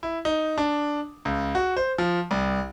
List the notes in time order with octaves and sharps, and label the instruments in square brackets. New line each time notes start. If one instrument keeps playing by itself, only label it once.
[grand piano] E4
D#4
D4
C#2
F#4
C5
F3
C2